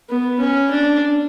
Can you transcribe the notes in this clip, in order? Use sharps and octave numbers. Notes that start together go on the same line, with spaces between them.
B3
C#4
D4